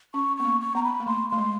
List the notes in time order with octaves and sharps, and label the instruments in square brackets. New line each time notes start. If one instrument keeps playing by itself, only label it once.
[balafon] C#4 [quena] C#6
[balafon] B3 [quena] C#6
[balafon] A#3
[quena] C#6
[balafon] B3 [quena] A#5
[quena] B5
[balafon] A#3
[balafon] A3 [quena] C6
[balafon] A3 [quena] C6
[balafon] G#3